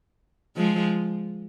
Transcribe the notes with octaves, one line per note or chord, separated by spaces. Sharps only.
F3 G#3